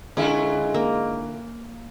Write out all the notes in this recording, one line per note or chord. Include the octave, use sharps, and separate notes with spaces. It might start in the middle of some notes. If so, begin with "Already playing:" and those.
D3 G#3 C#4 E4 F4
A#3